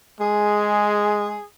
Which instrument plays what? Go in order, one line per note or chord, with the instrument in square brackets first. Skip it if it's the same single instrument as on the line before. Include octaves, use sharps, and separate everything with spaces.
[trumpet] G#3 [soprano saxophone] G#4